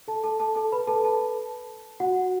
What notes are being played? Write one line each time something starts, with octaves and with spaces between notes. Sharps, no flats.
A4 A5
A4 A5
A4 A5
A4 A5
B4 B5
A4 A5
A4 A5
F#4 F#5